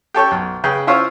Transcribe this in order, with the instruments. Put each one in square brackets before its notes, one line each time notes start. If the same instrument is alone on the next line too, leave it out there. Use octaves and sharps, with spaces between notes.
[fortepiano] G4 A4 C#5 G5
B1
C#3 B4 G5
E4 F4 C5 C#5 E5 F5